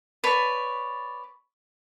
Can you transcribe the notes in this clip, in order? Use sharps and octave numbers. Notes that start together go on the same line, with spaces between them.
B4 C#5 D5 A5